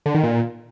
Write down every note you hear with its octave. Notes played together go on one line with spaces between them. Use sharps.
D3
D#3
A#2